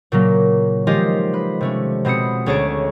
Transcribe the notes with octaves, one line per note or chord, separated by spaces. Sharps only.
A#2 C#3 F#3 A#3
D#3 F3 G#3 F4 G4 D#5
B4
C3 A3 C#4
B2 C4 B4 D#6 C#7
D2 C#4 G#4 C#5 A5 D7